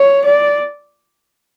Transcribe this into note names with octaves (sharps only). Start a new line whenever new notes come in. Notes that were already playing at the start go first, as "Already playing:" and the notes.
Already playing: C#5
D5